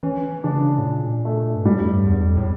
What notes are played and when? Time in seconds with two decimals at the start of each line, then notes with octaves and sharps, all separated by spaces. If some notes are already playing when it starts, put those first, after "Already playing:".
0.03 E3 C#4
0.44 C#3 D4
0.78 A2
0.85 A#2
1.25 A3
1.55 G2
1.65 A2 G3
1.81 F2
1.86 G2
2.06 E2
2.27 F2
2.37 A2